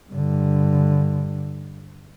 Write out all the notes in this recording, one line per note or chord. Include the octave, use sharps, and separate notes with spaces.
G2 D3